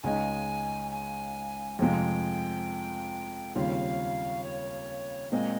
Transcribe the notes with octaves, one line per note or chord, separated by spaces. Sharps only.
C#2 C#3 G#3 D#4 G#5
G#5
F2 C3 F3 G#3 C4 G5
D#2 C#3 G3 C4 F4 F5
C#5
A#2 G#3 C4 D#5